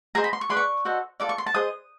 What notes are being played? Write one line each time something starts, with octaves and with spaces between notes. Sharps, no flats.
G#4 C5 D#5 A#5
B5
C6
C#6
G#4 B4 D5 C6
C#6
F#4 A4 C5 D#5
F4 A4 D5 D6
C#6
C6
A5
G#4 C5 D#5 D#6